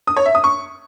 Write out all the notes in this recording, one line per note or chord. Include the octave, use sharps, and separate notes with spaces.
D#6
C#5
E5
D#6
C#6